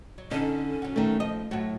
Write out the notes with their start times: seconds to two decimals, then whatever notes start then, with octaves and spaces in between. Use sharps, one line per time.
0.18 F#3
0.31 D3 C#4 D#4 A4
0.82 F#3 F#4
0.96 D#3 A3
1.20 F3 D#5
1.51 A2 F#3 F#4